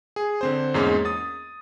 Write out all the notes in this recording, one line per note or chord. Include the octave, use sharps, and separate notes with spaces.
G#4
D3 C4 C5
E2 G#2 G#3 A#3 C#4
D#6 A6